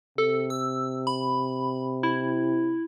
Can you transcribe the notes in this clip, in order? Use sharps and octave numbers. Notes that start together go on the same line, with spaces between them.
C3 A4
E6
B5
E4